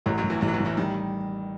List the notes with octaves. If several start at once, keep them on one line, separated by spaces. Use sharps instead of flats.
A1 F#2 F#3
F#2 F#3
A1
E2 E3
A1 E2 E3
F#3
E2 E3
A1
E2 E3
D#3 G3